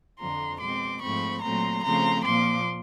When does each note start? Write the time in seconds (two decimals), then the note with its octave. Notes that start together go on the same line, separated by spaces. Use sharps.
0.19 F2 D3 F3 A#5 C6
0.60 B2 G#3 C4 C6 D6
1.02 G#2 F3 A3 C4 B5 C#6
1.42 A#2 F#3 A3 C4 A#5 C6
1.84 C#3 F3 A3 C4 A#5 C6
2.25 A#2 F3 A#3 C6 D6